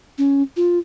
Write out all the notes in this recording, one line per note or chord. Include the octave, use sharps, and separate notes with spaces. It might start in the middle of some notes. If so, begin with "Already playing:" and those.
C#4
F4